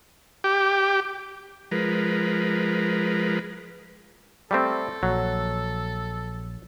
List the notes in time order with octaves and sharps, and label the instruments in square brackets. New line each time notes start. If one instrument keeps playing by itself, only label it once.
[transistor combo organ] G4
F3 G#3 A#4 B4
[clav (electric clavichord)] G3 A3 C4 [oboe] A4
[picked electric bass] A#1 [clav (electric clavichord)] F#3